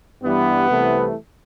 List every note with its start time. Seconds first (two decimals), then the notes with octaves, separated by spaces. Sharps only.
0.22 G2 E3 G3 B3
0.69 C2 C3 E3 A3